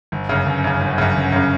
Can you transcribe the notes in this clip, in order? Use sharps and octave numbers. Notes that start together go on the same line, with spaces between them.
G1
F#2 C#3
G1
F#2 C#3
G1
F#2 C#3
G1
F#2 C#3